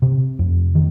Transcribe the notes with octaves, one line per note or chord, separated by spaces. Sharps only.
C3
F2
D#3